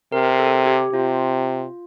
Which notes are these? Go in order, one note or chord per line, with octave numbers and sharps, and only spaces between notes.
C3 A#4
A#4
A4
G4
C3 F4